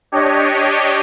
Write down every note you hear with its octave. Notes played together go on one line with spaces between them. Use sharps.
D4 G4 C#5 D#5